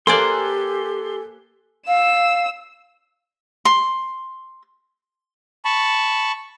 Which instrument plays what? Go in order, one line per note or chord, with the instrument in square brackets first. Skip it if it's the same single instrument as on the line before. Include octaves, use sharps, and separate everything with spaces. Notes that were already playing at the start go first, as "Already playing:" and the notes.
[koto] A#3 C5 D5 [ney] G4 [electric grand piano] A4 G#5 F#6 [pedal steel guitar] C6
[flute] F5 [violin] E6 E7
[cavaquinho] C6
[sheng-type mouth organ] A5 B5 C#6